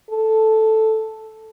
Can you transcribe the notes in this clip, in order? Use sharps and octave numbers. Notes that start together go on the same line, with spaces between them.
A4